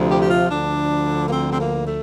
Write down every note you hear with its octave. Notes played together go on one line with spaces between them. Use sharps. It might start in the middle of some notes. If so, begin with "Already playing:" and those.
Already playing: D2 C3 F3
G4
G4
F4
D2 D3 F3 D4
A#3
C4
C4
A#3
A3